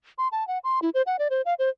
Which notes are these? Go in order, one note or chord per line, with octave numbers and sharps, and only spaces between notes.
C6
A5
F#5
C6
E4
C5
F#5
D5
C5
F5
C5